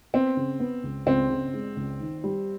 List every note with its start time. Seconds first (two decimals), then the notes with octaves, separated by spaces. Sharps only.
0.14 B3 C4
0.37 C#3
0.60 B3
0.83 C#2
1.06 C#2 C4
1.29 C#3
1.53 G#3
1.76 C#2
2.00 D#3
2.24 G3